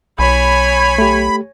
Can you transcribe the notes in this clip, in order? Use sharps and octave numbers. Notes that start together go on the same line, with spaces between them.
B1 C#5 G#5 B5
A3 G4